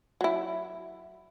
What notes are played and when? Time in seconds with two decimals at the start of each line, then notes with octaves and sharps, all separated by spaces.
0.21 F#3 E4